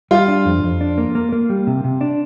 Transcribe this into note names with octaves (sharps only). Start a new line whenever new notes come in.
G3 F4
D4
F2
F2
D4
A#3
A#3
A#3
G3
C3
C3
D4